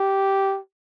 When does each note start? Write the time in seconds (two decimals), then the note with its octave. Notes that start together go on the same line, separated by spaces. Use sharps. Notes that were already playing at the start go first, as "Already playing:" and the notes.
Already playing: G4